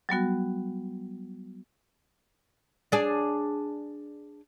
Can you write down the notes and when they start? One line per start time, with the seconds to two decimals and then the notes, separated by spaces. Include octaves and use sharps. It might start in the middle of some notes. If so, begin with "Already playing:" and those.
0.09 F#3 G3 B3 F#4
2.92 D4 G#4